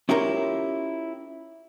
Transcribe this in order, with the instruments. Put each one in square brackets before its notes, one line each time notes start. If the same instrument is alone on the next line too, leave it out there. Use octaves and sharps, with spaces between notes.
[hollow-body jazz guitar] C#4 E4 F4 G4 A#4 C#5